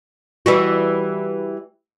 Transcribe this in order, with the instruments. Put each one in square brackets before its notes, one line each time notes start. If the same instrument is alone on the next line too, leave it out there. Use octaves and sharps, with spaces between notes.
[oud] E3 G3 F#4